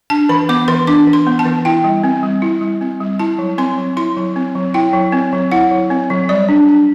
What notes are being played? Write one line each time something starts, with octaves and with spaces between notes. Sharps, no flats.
D4 A5
E3 B5
B3 D6
E3 C6
D4 D6
E3
C6
B3
A5
E3
E4 G5
G3
C4
G3
E4
G3
C4
G3
E4 A5
F#3
C4 C6
F#3
E4 C6
F#3
C4
F#3
E4 G5
F#3
C4
F#3
E4 F#5
F#3
C4
F#3
G3 D5
D4
D4